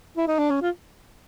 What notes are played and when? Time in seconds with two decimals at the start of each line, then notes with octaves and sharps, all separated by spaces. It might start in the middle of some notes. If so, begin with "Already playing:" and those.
0.17 E4
0.28 D#4
0.39 D4
0.50 C#4
0.62 F4